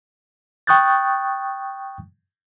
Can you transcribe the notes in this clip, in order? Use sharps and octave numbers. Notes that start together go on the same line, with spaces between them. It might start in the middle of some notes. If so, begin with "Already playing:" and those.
G5 C#6 D#6 F#6 G6 A6